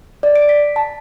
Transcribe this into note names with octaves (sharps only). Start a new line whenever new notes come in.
D5
D7
B6
A5